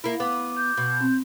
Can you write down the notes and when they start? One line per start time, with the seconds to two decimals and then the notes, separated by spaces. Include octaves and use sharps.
0.04 A#3 E4
0.20 B3 D6
0.57 G6
0.77 B2
1.01 C4